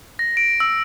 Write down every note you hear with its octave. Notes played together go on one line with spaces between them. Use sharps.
A#6
D7
E6